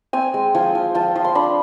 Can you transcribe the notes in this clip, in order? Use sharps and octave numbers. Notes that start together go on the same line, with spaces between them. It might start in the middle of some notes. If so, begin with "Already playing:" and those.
C4 G#5
G#3
F3 G#5
F3
F3 A5
F3
C6
D4 B5